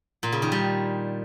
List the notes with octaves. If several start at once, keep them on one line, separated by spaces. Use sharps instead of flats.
A#2
C#3
D#3
G3